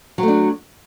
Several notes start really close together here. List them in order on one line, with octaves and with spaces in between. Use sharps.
F#3 A3 D4